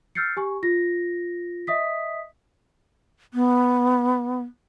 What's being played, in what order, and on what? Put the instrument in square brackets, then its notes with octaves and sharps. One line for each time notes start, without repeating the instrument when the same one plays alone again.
[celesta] E6 F6 G6 A6 C7 C#7
G4 G#5 C#6
F4 A#6
D#5 E5 D#6 B6
[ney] B3